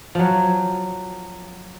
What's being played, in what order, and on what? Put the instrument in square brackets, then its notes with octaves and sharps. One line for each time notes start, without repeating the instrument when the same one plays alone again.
[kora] F3 F#3